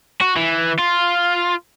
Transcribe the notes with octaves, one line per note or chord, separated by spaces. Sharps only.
F#4
E3
F4